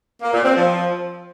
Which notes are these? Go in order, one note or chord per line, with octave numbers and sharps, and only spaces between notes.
A#3
A#2
C4
F3